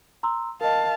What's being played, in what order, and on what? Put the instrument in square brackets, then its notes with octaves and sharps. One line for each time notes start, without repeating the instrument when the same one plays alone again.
[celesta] A#5 C6 E6
[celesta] A#4 D#5 [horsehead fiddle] F5 A5